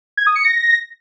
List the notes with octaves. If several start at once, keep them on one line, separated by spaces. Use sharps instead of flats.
G#6
D#6
C#7
A#6